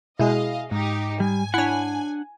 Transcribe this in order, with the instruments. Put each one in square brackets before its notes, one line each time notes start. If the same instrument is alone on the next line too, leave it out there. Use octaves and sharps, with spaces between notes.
[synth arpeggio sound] B2 G#3 [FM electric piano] E4 G#4 [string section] D#5 F5
[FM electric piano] G#2 [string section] D#4 G4
[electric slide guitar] G3 [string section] G#5
[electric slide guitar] D4 F#5 [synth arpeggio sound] E4 C#5